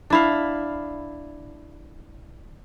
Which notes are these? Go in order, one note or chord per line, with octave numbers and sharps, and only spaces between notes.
D4 E4 F5